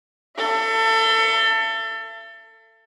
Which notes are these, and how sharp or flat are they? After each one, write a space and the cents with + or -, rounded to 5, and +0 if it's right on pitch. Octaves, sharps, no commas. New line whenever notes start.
A4 +25 E5 +45